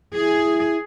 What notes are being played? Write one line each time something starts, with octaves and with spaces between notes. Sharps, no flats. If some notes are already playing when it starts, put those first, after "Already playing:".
E4 G#4